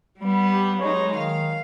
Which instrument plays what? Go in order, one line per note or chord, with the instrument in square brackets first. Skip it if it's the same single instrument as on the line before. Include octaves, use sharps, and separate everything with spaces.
[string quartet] G3 B3
[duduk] G4
[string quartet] F#3 G#3 D#4 [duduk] C#5
[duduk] D#3 [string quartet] F5